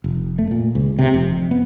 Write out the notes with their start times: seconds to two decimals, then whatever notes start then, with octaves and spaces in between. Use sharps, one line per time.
0.04 F1
0.39 A3
0.51 A#2
0.75 C#2
0.99 C3
1.14 F1
1.32 F2
1.51 B3